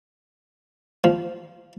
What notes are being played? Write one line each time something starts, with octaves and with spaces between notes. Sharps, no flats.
F3